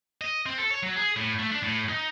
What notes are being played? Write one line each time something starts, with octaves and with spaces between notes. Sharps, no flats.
D#5
C4
A4
C#5
F#3
G#4
A2
A3
D4
A2
D#4